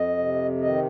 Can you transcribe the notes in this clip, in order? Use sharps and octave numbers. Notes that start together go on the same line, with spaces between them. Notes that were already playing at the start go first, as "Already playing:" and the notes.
Already playing: F2 D#5
C3
D#3 D#5